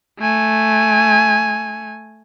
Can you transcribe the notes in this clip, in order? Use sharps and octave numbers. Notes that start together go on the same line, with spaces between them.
A3 G#5